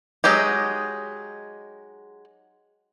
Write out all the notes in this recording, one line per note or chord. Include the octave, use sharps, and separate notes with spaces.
F#3 G#3 D#4 G4